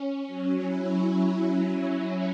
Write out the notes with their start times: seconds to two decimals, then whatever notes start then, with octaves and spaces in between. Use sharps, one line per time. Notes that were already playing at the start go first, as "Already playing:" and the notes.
Already playing: C#4
0.27 F#3
0.61 E4